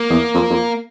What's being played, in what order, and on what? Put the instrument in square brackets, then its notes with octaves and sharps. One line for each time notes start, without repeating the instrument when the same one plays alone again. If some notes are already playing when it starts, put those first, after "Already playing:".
Already playing: [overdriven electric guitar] A#3
[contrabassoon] E2
F2
F2